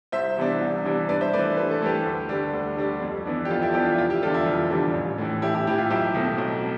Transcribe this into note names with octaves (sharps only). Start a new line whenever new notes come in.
C2 C5 E5
C3 E3 B3 D4
C2
C3 E3 B3 D4
G2 B4 D5
C5 E5
E3 A3 B4 D5
G2 B4
A4
E3 A3 G4 B4
D2
D3 G3 D4
D2
D3 G3 D4
F2
E3 B3 D4
G4
F2 F4 A4
E4 G4
E3 B3 D4 E4 G4
F4
E4
F1 F4
E4 G4
E2 D3 G3 D4 F4 A4
E4
F1 F4
E2 D3 G3 D4
A1
A2 E3
A1 E4 G4
E4 G4
A2 E3 E4 G4
F4
B1 E4 G4
B2 A3 C4
B1
C4